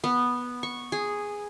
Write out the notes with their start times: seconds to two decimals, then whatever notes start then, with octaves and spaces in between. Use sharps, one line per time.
0.04 B3
0.63 C#6
0.92 G#4